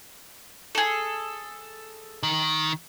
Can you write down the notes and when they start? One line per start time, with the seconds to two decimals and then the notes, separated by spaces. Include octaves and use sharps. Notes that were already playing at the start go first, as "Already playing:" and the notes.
0.75 G#4 A4
2.23 D#3